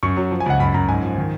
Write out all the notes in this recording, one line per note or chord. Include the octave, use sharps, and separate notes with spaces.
F#2 C#6
F#3
F3
G#5
C#2 F#5
F#2 B5
F#2 A#5
G#2 G#5
F3
D#3